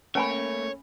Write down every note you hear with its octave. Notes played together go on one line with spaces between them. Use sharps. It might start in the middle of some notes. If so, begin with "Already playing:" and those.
A3 A#3 C#4 C#5 G#5 B5